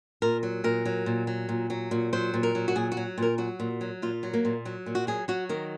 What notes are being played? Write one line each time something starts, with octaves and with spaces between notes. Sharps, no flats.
A#2 A#4
F#3
A#2 A#4
F#3
A#2
F#3
A#2
F#3
A#2
F#3 C5
A#2
A#4
F#3
F#4
A#2 G#4
F#4
F#3
A#2 A#4
F#3 F#4
A#2
F#3
A#2 F4
F#3
A#3
A#2
F#3
A#2
F#4
F#3 G#4
F#3 F#4
D#3 A#4